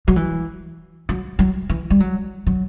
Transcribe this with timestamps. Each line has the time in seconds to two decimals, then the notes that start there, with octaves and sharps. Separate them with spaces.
0.08 F#3
0.16 E3
1.09 F#3
1.39 F#3
1.69 E3
1.90 G3
2.00 F#3
2.47 F#3